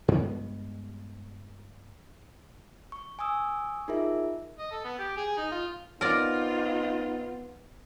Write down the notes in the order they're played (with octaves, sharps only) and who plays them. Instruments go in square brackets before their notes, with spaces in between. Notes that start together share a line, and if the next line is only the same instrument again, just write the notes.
[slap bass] G2 G#3 A#3 B3
[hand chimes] C#6
G#5 C#6 D#6 E6
D#4 F4 G#4 A#4 E5
[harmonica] D#5
A4
B3
G4
G#4
D#4
F4
[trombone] B3 [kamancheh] C4 F4 [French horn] D#4 [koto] A#4 D5